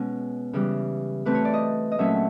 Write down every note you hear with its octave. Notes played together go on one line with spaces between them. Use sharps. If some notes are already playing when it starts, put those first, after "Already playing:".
Already playing: B2 G#3 C#4
C#3 E3 G3
E3 A3 C4 B4
C#5
D5
D#5
D#5
A#2 F#3 A3 C#4 E5